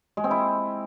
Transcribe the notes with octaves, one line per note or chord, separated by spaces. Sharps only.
G#3
C4
E4